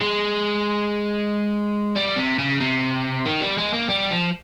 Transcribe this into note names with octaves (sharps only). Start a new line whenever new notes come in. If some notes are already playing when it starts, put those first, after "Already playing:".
G#3
G3
C3
C#3
C3
D#3
G3
G#3
A#3
G3
F3